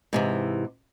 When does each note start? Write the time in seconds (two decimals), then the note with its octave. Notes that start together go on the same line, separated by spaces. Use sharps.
0.13 G#2 C3 E3